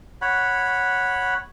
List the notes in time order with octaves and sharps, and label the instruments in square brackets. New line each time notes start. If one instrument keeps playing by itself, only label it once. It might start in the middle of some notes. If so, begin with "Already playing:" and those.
[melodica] C#5 F#5 B5